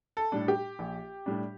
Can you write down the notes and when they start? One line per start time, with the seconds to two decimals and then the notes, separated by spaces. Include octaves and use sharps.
0.17 A4
0.32 A2 G3 D4
0.48 G4
0.79 A#1
1.26 A2 G3 D4